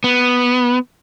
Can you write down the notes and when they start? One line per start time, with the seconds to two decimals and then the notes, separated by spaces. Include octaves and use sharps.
0.04 B3